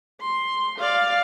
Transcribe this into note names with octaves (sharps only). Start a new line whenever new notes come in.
C6
D5 F5